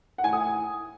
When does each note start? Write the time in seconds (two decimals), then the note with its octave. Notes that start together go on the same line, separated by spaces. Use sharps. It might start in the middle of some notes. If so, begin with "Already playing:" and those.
0.18 F#5
0.23 A2 G#5
0.33 D#6